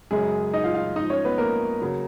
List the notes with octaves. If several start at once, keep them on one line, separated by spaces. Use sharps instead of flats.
F#2 C#3 F#3 G#3 G#4
D#4 D#5
F4 F5
F4 F5
G#2 F3 D#4 D#5
C#4 C#5
B3 B4
A#3 A#4
C#3 F#3